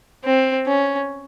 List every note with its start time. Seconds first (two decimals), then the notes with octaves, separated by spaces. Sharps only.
0.24 C4
0.67 C#4